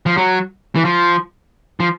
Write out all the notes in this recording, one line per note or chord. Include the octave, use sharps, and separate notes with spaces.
F3
F#3
E3
F3
F3